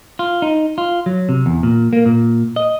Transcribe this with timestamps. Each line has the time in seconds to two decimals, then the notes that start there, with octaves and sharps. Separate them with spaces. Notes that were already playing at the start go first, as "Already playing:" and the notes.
0.19 F4
0.42 D#4
0.78 F4
1.06 F#3
1.29 C3
1.46 E2
1.63 A#2
1.93 A#3
2.06 A#2
2.56 D#5